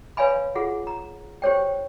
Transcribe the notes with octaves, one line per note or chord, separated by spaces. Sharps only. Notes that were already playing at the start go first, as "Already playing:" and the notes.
B4 C#5 F5 G#5 B5
F4 G#4 F#5
A#5
G4 C5 C#5 G5